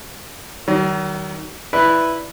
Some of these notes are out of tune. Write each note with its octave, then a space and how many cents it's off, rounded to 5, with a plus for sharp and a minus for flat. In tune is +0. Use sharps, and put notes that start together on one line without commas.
D#3 +0 F#3 +45
E4 +0 B4 +0 D5 +0